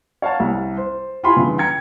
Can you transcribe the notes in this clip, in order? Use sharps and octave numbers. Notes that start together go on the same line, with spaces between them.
C#5 F5 F#5 A5
C2
C5
E4 F4 G4 G#5 B5 C6
G2 C#3 E3
G5 A#5 G#6 C#7